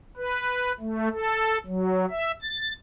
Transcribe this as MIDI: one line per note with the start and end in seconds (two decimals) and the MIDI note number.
0.17 0.72 71
0.80 1.09 57
1.12 1.58 69
1.66 2.05 54
2.10 2.31 76
2.42 2.73 93